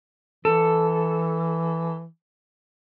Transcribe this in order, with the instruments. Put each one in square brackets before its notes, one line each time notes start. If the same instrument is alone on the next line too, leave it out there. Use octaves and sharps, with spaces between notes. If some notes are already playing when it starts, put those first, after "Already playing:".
[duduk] E3 [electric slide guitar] A4